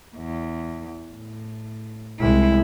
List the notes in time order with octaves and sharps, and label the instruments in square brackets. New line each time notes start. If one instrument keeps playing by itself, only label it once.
[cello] E2
A2
[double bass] C2 G#3 [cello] E4